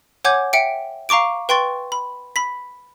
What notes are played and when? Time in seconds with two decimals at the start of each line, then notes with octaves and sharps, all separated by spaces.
0.24 C#5 F#5 G#5 D6 G6 G#6
0.53 E5 G5 C#7 D7
1.09 F5 A#5 C#6 D6 D7
1.49 B4 G5 C6 C#6 A6
1.92 B5
2.36 B5 B6